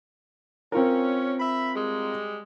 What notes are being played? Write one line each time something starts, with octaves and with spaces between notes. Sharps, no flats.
C4 C#4 F4 A#4
E5 B5
G3 G#3